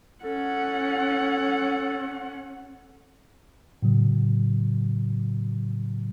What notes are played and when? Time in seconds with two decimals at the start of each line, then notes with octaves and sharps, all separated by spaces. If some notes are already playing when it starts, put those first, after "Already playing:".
0.24 C#4 A4 F#5
3.82 A2 C#3 F#3